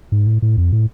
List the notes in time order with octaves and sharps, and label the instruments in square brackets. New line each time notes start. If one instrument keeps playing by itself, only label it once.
[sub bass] G#2
A2
A2
F2
A2